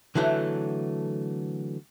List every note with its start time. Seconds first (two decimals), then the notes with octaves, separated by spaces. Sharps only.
0.15 D3 E3 F#3 A3